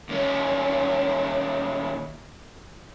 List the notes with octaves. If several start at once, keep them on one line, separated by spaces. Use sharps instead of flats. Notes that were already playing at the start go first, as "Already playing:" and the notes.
D#2 C#4